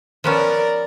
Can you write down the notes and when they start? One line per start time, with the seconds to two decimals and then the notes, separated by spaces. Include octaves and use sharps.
0.24 F3 B3 C#4 A#4 D5